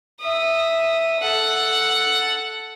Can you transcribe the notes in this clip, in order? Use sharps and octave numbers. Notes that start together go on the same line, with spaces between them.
E5 D#6
A4 F#5